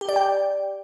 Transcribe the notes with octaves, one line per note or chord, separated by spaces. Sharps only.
G4
D5
G5